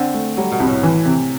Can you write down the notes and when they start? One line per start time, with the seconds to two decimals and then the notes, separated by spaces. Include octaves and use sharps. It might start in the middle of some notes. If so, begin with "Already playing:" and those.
Already playing: D3 C4
0.14 A3
0.37 F#3 G3
0.52 B2
0.60 C2
0.67 A2
0.83 E3
1.05 C3